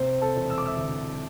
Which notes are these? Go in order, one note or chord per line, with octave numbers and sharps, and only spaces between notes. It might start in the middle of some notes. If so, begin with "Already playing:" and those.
Already playing: C3 C4 C5
A4 A5
E1
E6
D6
E5 E6
D2